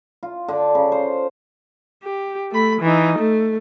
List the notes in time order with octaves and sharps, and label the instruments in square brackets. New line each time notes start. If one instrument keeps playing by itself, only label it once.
[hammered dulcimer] F4
D3
C#3
C5
[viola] G4
A3 B5
E3 D#4
A3